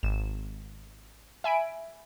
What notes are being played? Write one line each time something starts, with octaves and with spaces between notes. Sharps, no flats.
G#1 E7
E5 G#5 B5 D7